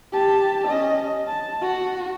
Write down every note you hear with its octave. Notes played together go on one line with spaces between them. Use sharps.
G4 A5
C#4 D#5
A5
F#4